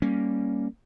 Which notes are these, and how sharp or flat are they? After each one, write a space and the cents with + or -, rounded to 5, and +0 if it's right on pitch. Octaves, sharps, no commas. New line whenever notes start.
G3 +0 A#3 +0 C#4 +0